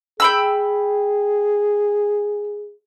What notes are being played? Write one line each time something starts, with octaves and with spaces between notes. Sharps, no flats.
G#4 G5 B5 E6